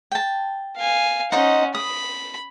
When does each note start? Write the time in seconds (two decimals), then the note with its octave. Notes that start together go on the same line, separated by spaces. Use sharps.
0.12 G5 A5
0.76 F5 G#5
1.32 C#4 D#4 C5 D#5 F#5
1.75 B5 D#6